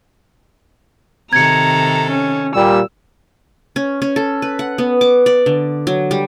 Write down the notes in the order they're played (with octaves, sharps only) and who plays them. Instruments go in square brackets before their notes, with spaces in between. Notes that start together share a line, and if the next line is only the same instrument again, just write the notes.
[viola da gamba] C3 D#3 A4 [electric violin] A#5 [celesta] G#6 C#7
[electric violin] C#4
[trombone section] A#2 G3 [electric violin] E6
[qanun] C#4
C#4
A4
B4
F#5
B3
D6
D5
D3
F#3
G3